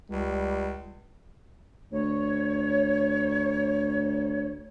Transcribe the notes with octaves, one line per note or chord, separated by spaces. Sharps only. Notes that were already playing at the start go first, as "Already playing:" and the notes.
C#2 G3
D2 C#5